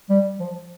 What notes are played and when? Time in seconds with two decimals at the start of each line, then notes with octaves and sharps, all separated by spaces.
0.10 G3
0.40 F3